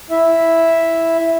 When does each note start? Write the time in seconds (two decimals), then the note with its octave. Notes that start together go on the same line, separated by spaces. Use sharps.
0.11 E4 E5